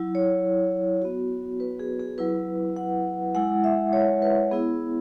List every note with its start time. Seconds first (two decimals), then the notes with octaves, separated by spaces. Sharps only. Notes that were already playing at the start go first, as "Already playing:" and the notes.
Already playing: F#3 E4
0.15 C#5
1.02 B3 F#4
1.60 B4
1.79 G#4
1.99 G#4
2.18 F#3 E4 B4
2.76 F#5
3.35 G#3 E4 F#5
3.64 E5
3.93 C#5
4.22 B4
4.51 B3 E4 G#4